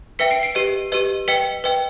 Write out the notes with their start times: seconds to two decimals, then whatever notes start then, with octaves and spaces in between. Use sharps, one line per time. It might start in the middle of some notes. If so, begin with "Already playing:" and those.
0.19 B4 E5 G5 B6 C#7
0.31 C7 D7
0.43 C7 D7
0.55 G4 B4 D#5
0.92 G4 B4 D#5
1.28 B4 D#5 G5 B6 C#7
1.64 B4 D#5 G5